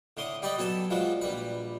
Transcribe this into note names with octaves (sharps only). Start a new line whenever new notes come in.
A2 D3 C6 D6 D#6
G3 G4 B4 D5 D#5
F#3 B3 A4 G#5 A5
F3 G3 G#3 F#4
A#1 G3 B4